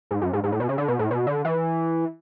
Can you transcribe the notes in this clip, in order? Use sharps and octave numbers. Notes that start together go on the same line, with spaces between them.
G#2
F#2
G#2
G#2
A2
B2
C#3
D3
B2
A2
B2
D3
E3